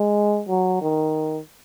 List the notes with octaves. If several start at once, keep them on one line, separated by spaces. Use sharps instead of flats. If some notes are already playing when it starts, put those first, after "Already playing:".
Already playing: G#3
F#3
D#3